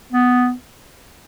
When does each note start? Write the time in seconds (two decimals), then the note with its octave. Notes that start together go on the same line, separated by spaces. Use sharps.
0.13 B3